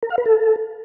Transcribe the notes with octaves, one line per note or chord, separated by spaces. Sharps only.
A#4
F5
B4
A4